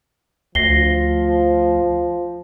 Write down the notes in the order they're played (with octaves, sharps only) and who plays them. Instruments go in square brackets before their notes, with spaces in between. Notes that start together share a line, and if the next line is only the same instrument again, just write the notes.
[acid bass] D2 [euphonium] F3 [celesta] A#6 C7 G7